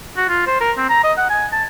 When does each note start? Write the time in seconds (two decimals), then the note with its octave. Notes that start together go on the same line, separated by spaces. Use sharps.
0.17 F#4
0.29 F4
0.47 C5
0.61 A#4
0.77 C4
0.89 A#5
1.03 D#5
1.18 F#5
1.30 G#5
1.52 A5